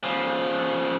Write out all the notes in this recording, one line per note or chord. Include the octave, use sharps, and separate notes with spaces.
C#3 F3